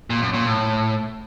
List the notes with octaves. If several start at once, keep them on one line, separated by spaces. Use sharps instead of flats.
A#2
F#2
A#2
A2